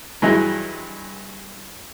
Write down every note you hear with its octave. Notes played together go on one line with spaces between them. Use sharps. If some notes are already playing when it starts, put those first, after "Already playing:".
G2 E3 F#3 G#3 D#4